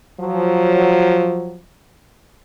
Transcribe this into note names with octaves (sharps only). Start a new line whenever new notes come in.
F3 F#3